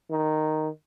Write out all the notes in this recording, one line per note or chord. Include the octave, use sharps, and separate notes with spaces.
D#3